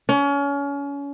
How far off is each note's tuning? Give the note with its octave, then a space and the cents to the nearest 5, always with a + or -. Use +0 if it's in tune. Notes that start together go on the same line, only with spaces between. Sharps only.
C#4 +30